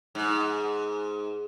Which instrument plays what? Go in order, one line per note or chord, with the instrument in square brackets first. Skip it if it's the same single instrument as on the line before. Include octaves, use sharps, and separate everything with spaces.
[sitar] G#2